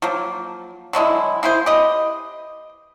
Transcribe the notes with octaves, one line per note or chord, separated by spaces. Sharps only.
F3 F#3 A#3
D3 F#3 G#3 E4
A#3 E4 G#4 C5
G4 B4 D#5